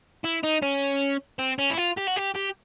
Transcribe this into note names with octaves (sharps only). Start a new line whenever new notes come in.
E4
D#4
C#4
C4
C#4
E4
F4
G4
F#4
G4
G4